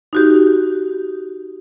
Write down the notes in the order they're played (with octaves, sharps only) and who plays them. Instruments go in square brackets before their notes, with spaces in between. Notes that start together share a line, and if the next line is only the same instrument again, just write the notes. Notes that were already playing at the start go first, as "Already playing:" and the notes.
[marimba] D#4 F#4 G4